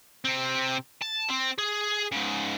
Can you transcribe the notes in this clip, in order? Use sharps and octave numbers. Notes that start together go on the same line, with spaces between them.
C3 C4
A5
C4
G#4
G#2 C#3